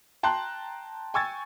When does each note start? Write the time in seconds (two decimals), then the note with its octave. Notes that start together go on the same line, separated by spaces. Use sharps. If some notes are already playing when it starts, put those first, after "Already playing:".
0.23 G5 A5 A#5 C6 F#6
1.14 G5 G#5 C#6 E6 G#6 A6